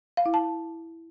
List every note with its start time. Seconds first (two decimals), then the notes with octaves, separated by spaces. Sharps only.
0.17 F5
0.26 E4
0.34 A5